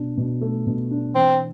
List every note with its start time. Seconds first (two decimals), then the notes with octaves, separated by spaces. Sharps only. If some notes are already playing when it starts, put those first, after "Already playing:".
Already playing: B2 D4
0.18 B2
0.41 A3
0.67 B2
0.91 D4
1.15 E3 C4